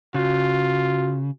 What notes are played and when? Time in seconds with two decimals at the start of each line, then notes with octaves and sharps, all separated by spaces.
0.14 C#3 F4 F#4